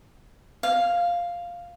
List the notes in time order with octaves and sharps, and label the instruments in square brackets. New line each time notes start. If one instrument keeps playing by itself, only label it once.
[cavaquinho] F5